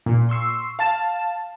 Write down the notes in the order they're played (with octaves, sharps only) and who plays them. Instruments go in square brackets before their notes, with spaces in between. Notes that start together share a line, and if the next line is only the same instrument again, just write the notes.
[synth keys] A#2
C6 C#6 E6 C7
F5 A5 A6 E7